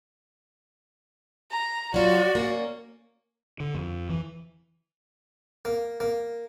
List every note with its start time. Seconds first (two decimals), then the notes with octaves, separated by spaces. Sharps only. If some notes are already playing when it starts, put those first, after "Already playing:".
1.51 A#5
1.94 F#3 F4 F#4 D5
2.35 A#3 C#4
3.60 D3
3.74 F2
4.09 E3
5.65 A#3
6.00 A#3